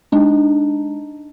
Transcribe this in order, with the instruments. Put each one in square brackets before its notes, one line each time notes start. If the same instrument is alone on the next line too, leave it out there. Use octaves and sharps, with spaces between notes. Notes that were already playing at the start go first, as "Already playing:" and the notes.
[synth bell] G#3 D4 D#4